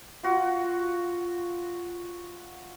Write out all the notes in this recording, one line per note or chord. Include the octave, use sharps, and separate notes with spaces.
F4 F#4